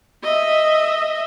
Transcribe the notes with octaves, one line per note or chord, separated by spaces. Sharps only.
D#5 E5